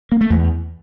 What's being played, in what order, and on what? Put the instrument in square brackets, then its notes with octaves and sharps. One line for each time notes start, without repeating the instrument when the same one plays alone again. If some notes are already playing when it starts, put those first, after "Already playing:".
[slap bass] A#3
A3
E2